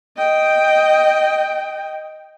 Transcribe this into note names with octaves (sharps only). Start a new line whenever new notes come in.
D#5 G5